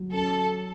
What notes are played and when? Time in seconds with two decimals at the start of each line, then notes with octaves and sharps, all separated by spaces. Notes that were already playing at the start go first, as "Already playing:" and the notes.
Already playing: F#3
0.13 C#4 A4